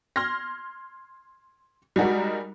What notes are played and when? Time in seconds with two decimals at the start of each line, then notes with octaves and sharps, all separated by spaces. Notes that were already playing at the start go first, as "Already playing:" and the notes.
0.16 C6 F6 G#6 A#6
1.96 G3 G#3 D#4 F#4 A#4